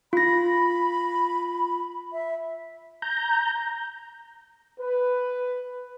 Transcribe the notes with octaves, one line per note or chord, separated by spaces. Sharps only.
F4 B5 A#6
E5
A#5 G6
B4